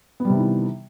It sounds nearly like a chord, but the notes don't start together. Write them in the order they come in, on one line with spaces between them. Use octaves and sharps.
B3 G3 C3 D#3 E3